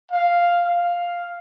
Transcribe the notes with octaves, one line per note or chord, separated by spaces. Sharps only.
F5
F5